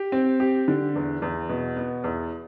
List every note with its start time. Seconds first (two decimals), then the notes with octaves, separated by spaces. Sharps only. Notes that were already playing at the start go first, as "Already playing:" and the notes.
Already playing: G4
0.12 C4
0.40 G4
0.68 D3
0.95 E2
1.22 E2
1.49 B2
1.76 B3
2.04 E2